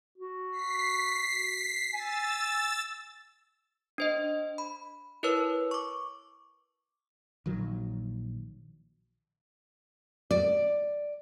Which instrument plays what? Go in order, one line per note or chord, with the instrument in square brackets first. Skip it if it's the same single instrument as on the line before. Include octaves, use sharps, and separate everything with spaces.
[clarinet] F#4
[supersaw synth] B6 C7
[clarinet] G#5 [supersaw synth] E6 A6
[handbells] D4 C5 D#5
B5
E4 A#4 B4 C#5 E6
C#6 D6
[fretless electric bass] A#1 D#3 F#3
[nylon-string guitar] D5